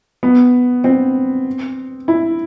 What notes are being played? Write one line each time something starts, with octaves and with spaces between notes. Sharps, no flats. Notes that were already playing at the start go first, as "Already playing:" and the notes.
B3
C4
E4